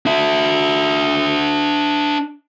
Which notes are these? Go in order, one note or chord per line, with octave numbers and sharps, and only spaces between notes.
D4 E5